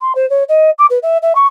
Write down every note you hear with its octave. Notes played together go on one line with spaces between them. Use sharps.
C6
C5
C#5
D#5
D6
B4
E5
E5
C#6